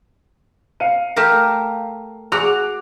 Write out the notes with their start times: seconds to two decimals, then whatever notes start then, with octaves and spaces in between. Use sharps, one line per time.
0.80 F5 C#7 D#7
1.16 A3 G4 A#4
2.32 F#4 G#4 D6 F7